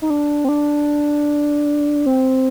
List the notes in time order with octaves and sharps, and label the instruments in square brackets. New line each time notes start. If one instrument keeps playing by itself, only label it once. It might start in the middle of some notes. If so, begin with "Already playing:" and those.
[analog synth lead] D#4
D4
C4
D4
C4